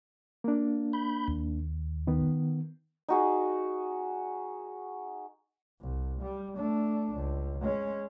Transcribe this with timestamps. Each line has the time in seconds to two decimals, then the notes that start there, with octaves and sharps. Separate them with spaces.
0.44 A#3 D4
0.93 B5 G6
1.28 D#2
2.07 D#3 B3
3.09 D#4 F#4 G#4
5.80 C2
6.22 G3
6.56 A3 D4
7.15 C#2
7.61 G#3 C#4